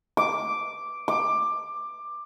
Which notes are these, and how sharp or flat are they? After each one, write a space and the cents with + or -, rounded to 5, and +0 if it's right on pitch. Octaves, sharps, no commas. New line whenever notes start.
D6 -5
D6 +15